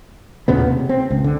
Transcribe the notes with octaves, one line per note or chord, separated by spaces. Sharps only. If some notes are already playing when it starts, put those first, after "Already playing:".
D#2 A#2 C#3 B3
C3
C4
C#2
D3